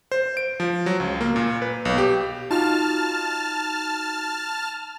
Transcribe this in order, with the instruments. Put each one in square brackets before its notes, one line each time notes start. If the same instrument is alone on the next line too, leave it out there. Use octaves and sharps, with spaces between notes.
[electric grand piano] C5
D7
F3
F#3
C#2
A#3
A#2
B4
B1
G4
[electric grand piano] D#4 F4 F#4 [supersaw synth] A5 F6